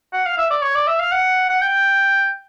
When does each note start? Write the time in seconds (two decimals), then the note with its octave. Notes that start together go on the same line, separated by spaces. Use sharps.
0.13 F#5
0.26 F5
0.37 E5
0.50 D5
0.62 C#5
0.75 D5
0.87 E5
0.99 F5
1.12 F#5
1.49 F#5
1.62 G5